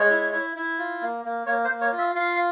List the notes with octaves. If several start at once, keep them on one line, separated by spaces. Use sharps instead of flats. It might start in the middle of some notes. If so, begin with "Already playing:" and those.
Already playing: G#3 C#5
E4
E4
E4
F4
A#3
A#3
A#3 C#5
C5
A#3
C#5
F4
E5
F4 F5